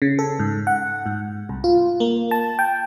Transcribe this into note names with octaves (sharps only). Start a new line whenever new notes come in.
C#3
A4
G#2
F#5
G#2
C2
F4
A#3
A5
G5